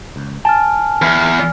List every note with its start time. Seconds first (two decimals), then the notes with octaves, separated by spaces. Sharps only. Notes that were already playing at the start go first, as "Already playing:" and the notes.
0.16 C#2
0.45 G#5 A5 F6
1.02 E2 F6